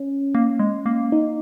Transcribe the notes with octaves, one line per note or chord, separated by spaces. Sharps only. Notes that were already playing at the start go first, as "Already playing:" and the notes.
Already playing: C#4
A#3
G#3
A#3
D#4